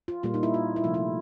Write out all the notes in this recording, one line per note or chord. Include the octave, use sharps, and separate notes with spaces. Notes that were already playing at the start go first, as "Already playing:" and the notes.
F4
A#2 G3 A#3 F4
D#4
E4
F4
E4
C3 F3 A3 F4
E4